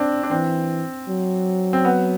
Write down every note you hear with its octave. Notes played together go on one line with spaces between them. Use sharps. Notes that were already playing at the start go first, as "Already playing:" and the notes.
Already playing: C4 D4
D4
E3 C4
F#3
C4
B3